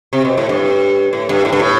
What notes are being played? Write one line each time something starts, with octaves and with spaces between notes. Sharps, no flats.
C3
B2
A2
G2
A2
G2
A2
G2
A2